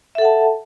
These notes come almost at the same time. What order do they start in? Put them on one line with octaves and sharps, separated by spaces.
E5 A4 F#5 A5